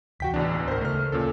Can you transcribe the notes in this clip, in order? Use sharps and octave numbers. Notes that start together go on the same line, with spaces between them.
D2 C3 E3 F#4 G5 B6
A1 E2 D4
D1 D#2 B3 A#4 C5
C#3 A3 C5 F6
D2 A#2 C#4 A4